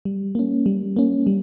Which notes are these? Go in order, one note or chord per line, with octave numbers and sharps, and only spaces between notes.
G3
A#3 C#4
G3
A#3 C#4
G3